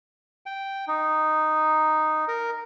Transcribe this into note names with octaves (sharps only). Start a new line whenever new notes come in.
G5
D#4
A#4